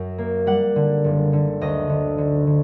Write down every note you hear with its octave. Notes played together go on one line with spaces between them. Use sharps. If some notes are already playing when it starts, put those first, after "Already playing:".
Already playing: F#2 F#3
A#3
G3 F#5
D3
F#1
D3
D2 D#5
D3
D3
D3